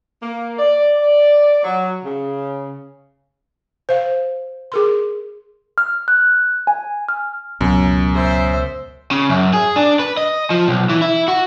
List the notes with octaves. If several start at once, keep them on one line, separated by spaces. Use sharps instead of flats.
A#3
D5
F#3
C#3
C5 F5
G#4 A#4 C6
F6
F#6
G#5
F6
C#2 F#2 B2
C5 E5
C#3
F#2
G#4
D4
B4
D#5
F3
B1
E3
E4
F#4